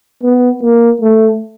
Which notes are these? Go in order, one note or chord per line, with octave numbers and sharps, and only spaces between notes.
B3
A#3
A3